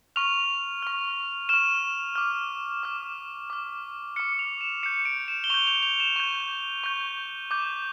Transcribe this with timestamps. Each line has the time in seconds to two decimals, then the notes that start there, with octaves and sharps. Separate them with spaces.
0.16 C#6 F6 F7
0.83 C#6 F6
1.49 C#6 F6 E7
2.16 D6 F6
2.83 D6 F6
3.50 D6 F6
4.16 D6 F6 C#7
4.39 F7
4.61 E7
4.83 C#6 G6 C#7
5.05 D7
5.28 E7
5.44 G7
5.50 C#6 G6 F7
5.67 F7
5.83 F7
6.00 E7
6.16 C#6 G6
6.84 C#6 G6
7.51 D6 G6